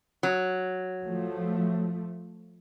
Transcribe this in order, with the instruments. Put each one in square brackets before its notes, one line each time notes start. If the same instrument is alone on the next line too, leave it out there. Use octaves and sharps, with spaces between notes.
[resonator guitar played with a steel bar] F#3
[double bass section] F3 A3